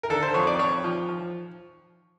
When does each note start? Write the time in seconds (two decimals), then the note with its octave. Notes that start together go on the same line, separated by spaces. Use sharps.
0.03 A#4
0.10 D3 A4
0.23 C5
0.34 F2 C#5
0.47 D5
0.59 F2 C#5
0.84 F3
1.09 F3